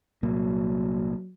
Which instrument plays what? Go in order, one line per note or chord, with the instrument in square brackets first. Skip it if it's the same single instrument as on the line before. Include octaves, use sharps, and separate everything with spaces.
[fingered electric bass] C2 A#2 A#3 [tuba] F#3